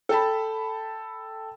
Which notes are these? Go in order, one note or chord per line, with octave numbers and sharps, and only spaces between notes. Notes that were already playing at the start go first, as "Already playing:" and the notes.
A4 G5 A5 B5